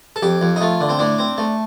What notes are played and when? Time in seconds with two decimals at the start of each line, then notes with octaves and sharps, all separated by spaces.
0.16 A4
0.23 F2 G4
0.41 F2
0.56 D#4
0.61 A3 F4
0.81 D3
0.89 C4
0.99 A2 D4
1.19 C4
1.38 A3